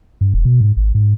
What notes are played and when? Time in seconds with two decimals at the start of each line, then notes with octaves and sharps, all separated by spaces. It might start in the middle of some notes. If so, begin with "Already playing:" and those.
0.21 G2
0.34 E1
0.45 B2
0.61 G#2
0.77 G#1
0.95 G#2